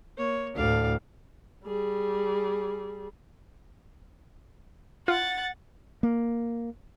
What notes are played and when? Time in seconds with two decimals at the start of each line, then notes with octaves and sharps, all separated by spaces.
0.18 A#3 C#5
0.56 D2 A2 D5 F5
1.65 G3 G#4
5.08 F4 F#5 A6
6.03 A#3